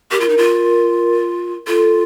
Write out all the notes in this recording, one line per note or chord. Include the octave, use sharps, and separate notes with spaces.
G4 A#4
F4
D#4
F4
F4 A4